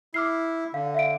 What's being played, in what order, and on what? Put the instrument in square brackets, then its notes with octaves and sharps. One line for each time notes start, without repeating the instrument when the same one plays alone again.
[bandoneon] E4 [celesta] D6 F6 C7
[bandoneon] D3 [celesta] F5
[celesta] E5 F5 D7